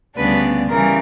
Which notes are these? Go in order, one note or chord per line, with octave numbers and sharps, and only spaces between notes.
D2 C#3 G3 B3 D4 B4
C#3 E3 G3 A#4